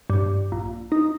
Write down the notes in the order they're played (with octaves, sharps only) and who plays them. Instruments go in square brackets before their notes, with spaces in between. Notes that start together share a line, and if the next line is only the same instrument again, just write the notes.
[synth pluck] G2
A#1
D#4